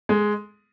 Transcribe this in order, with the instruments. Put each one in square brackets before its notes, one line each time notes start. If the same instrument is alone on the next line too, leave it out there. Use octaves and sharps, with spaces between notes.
[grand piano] G#3